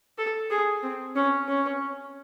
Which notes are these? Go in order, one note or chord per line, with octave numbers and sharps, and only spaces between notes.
A4
G#4
C4
C#4
C#4